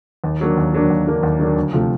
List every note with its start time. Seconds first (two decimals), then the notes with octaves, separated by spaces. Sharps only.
0.24 D#2
0.40 D3 F#3 A#3 D4
0.57 D#2
0.73 D3 F#3 A#3 D4
0.90 D#2
1.07 D3 F#3 A#3 D4
1.23 D#2
1.39 D3 F#3 A#3 D4
1.56 D2
1.73 C3 F3 A3